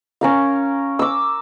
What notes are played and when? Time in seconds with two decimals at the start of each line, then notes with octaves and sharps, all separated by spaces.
0.21 C#4 A#4 F5
0.99 D6 E6